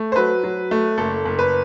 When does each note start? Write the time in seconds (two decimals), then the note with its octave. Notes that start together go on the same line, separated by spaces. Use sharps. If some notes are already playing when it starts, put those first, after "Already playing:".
Already playing: A3
0.12 C5
0.16 F#3 B4
0.43 F#3
0.71 A3
0.98 F#1 A4
1.25 F#1
1.39 B4